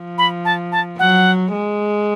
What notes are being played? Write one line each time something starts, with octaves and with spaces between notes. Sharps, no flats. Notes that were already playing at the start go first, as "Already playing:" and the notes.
Already playing: F3
B5
A5
A5
F#3 F#5
G#3